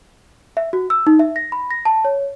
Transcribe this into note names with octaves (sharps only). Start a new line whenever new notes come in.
E5
F#4
E6
D#4
E5
A#6
B5
A#6
A5
C#5